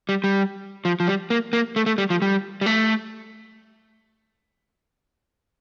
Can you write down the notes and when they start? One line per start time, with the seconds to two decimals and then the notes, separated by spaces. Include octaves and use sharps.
0.09 G3
0.24 G3
0.85 F3
1.00 F3
1.07 G3
1.30 A#3
1.53 A#3
1.76 A3
1.86 A3
1.98 G3
2.10 F3
2.22 G3
2.61 G3
2.66 A3